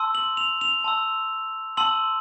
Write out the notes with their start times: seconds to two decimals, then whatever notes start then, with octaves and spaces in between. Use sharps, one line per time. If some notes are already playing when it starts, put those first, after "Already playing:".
Already playing: A5 C6 E6
0.15 F#7
0.37 F7
0.61 F7
0.84 A5 C6 E6
1.77 A5 C6 E6 F#7